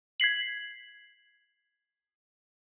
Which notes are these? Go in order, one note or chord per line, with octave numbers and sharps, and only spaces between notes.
G#6 B6 C7 F#7